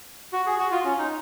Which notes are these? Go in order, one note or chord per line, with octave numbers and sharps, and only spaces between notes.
F#4
G#4
F#4
F4
C#4
D#4